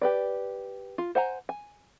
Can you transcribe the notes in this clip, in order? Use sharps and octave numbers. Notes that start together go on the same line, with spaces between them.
G4 B4 D5
F4
C5 F#5 G#5 A#5
G#5